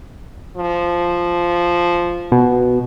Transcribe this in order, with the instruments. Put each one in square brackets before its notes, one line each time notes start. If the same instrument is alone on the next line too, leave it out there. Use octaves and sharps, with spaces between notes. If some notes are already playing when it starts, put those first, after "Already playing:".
[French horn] F3
[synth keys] B2